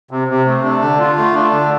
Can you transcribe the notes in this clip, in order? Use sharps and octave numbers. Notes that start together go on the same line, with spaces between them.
C3
C3
A3
D4
D3
F4
A3
D4
D3